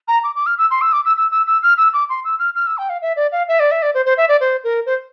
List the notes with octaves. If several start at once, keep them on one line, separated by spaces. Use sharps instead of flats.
A#5
D6
D6
F6
E6
C6
E6
D6
E6
E6
E6
E6
F6
E6
D6
C6
E6
F6
F6
E6
G5
F5
E5
D5
F5
E5
D5
E5
D5
C5
C5
E5
D5
C5
A#4
C5